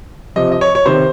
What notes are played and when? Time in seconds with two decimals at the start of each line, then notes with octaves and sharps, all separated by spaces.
0.36 C3 F3 D#5
0.52 D#5
0.61 C#5
0.75 C#5
0.86 C3 D#3 C5